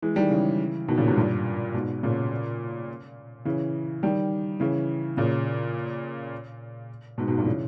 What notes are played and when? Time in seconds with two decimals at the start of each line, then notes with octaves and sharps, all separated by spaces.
0.02 E3 G#3
0.16 D#3 G3
0.30 C#3 E3
0.88 B2 D#3
0.98 A#2 C#3
1.07 G#2 B2
1.17 G2 A#2
1.74 G#2 B2
2.03 A#2 C#3
3.45 C#3 E3
4.03 D#3 G3
4.60 C#3 E3
5.17 A#2 C#3
7.18 G#2 B2
7.28 G#2 B2
7.38 G2 A#2
7.46 C#3 E3